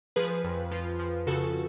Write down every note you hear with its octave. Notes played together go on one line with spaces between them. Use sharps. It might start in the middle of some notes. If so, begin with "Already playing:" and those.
F3 G#4 B4
F2
F3 F4
F3
C#3 F#4 A4